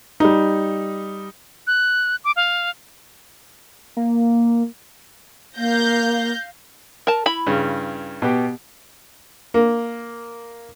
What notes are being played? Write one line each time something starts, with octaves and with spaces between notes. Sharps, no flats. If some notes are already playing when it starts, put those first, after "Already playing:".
G3 D#4
F#6
D6
F5
A#3
A#3 F5 G6 A#6
A#4 A5
E4 B5
G2 C#3
B2 B3 G4
A#3